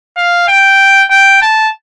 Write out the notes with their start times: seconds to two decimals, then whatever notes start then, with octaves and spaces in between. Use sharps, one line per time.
0.17 F5
0.48 G5
1.10 G5
1.42 A5